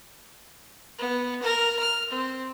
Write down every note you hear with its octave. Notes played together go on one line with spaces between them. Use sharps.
B3
A#4
F6
C4